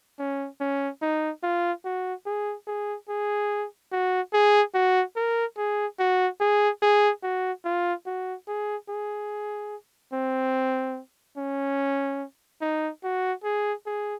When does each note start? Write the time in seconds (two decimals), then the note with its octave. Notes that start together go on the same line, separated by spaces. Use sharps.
0.19 C#4
0.61 C#4
1.02 D#4
1.43 F4
1.85 F#4
2.26 G#4
2.67 G#4
3.09 G#4
3.92 F#4
4.33 G#4
4.74 F#4
5.16 A#4
5.57 G#4
5.99 F#4
6.40 G#4
6.82 G#4
7.23 F#4
7.65 F4
8.06 F#4
8.48 G#4
8.89 G#4
10.13 C4
11.38 C#4
12.61 D#4
13.04 F#4
13.44 G#4
13.86 G#4